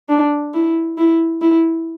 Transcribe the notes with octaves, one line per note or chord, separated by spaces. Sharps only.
D4
E4
E4
E4